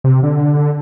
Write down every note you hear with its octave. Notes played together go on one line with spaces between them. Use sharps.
C3
D3